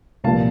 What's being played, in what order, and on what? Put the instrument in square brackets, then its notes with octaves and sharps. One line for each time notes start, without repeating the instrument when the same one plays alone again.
[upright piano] C2 A#2 F3 F5 A5